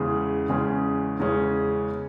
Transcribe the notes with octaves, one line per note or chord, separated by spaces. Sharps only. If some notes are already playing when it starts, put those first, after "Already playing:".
Already playing: E2 C#3 G#3 C#4 G#4
E2 C#3 G#3 C#4 G#4
E2 C#3 G#3 C#4 G#4